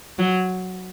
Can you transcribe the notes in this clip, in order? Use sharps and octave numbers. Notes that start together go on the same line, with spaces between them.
F#3